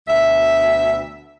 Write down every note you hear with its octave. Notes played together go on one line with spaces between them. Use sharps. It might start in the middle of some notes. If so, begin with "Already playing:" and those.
D2 B2 E5